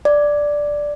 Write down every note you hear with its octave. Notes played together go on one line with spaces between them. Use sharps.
D5